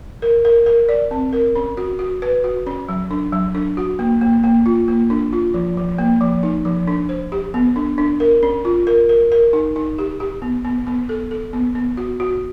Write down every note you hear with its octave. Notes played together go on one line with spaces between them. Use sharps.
A#4
A#4
A#4
D5
C4
A#4
C#4
F#4
F#4
B4
F#4
C#4
F#3
D4
F#3
D4
F#4
A#3
A#3
A#3
F4
A#3
D4
F4
F3
F3
A#3
F3
D#4
F3
D4
C5
G4
B3
D4
D4
A#4
C#4
F4
A#4
A#4
A#4
D#4
D#4
G4
G4
B3
B3
B3
A4
A4
B3
B3
F#4
F#4